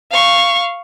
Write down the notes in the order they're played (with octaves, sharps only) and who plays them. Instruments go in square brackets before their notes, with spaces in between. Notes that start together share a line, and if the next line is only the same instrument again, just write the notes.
[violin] F5 C#6